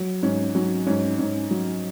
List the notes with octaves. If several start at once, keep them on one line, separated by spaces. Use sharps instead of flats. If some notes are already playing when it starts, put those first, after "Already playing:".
Already playing: F#3
G#2 C#4
F#3 C#4
G#2 C#4
G#2 C#4
F#3